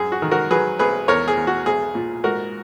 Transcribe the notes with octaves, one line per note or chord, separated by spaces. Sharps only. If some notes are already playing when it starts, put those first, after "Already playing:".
Already playing: F#2 G#4
F#4
D#3
F#4 A#4
F#3 G#4 B4
B1 G#4 B4
E2 A#4 C#5
G#4
E2
F#4
B1 G#4
A#2
G#2 F#4 A#4